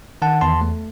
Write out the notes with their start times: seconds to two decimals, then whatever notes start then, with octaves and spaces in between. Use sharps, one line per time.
0.22 D#3 F#5 A5
0.41 E2 A5 C6
0.61 A3